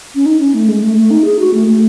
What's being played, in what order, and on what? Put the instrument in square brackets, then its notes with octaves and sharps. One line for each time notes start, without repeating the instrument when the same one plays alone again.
[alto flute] C#4
D#4
C#4
A3
G#3
A3
A3
D#4
G#4
F#4
A3
A3